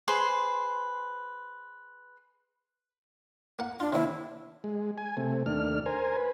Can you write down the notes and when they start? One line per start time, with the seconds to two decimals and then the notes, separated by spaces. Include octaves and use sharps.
0.08 G#4 B4 C5 C6
3.59 A#3 F#5
3.80 D4 F4
3.93 D#2 C3 E4
4.64 G#3
4.98 G#5
5.17 C3 A3
5.46 D#2 A3 D4 F6
5.86 A#4 C5 G#5
6.17 B4